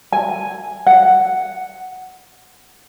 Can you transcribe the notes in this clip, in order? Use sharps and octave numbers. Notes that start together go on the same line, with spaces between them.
G#5
F#5